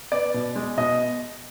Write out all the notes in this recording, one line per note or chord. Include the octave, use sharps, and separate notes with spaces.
B3 D5
B2
G#3
B2 D#5